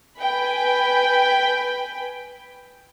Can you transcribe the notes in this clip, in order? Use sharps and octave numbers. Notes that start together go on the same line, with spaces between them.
B4 G5 G#5 B5